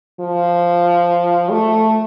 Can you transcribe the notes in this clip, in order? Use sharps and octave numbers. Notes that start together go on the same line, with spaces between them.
F3
A3